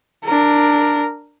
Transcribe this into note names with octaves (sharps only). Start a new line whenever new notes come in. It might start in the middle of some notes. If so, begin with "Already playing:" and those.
D4 A#4